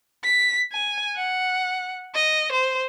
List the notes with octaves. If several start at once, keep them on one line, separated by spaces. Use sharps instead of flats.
B6
G#5
F#5
D#5
C5